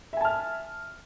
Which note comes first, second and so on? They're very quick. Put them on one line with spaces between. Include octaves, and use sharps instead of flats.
E5 G#5 A5 F6